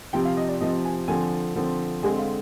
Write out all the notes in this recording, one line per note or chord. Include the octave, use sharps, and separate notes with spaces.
C3 F3 C4 G5
F5
D#5
D5
C3 F3 C4 D#5
G#5
D3 F3 C4 G#5
D3 F3 C4
D3 G#3 C4 G#5
F5